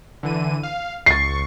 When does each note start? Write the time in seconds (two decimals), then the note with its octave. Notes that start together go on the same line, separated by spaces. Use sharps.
0.23 D3 E3 D#7
0.63 F5
1.06 C#2 C#6 A6 C7